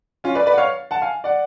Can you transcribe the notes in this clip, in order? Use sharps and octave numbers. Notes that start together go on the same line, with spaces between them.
C#4 F4
B4 D5
B4 D5
F#5
C#5 F5
F#5 A5
F5 G#5
D5 F#5